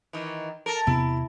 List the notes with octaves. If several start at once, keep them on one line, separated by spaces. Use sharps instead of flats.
D#3 E3
A4 A#4
E2 C3 B3 E4